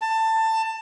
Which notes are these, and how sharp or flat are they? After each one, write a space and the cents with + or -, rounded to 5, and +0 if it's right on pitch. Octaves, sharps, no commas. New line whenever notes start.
A5 +20